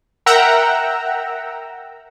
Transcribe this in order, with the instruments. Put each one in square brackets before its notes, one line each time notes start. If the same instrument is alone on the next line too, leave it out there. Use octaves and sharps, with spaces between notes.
[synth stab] A#4 E5 F#5 G5 A#5 E6